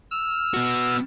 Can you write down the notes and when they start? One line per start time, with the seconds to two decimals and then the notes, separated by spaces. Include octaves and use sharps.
0.11 E6 F6
0.54 B3 F#4